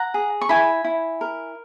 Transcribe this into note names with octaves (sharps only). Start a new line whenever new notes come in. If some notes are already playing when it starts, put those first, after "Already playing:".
Already playing: F#5 A#5
G#4
C#6
E4 G#5 B5
E4
A#4